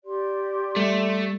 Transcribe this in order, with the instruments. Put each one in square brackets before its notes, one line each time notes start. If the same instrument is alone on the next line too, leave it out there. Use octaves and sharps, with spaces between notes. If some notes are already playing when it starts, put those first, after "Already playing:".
[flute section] G4 D5 C6
[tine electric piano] G3 [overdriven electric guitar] A3